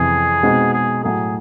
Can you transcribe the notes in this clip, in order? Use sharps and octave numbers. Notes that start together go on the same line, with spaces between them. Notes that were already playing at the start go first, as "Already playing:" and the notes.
Already playing: F2 C3 E3 G#4
B2 G#3 C4 D#4 F#4
G#4
A2 F#3 A3 G#4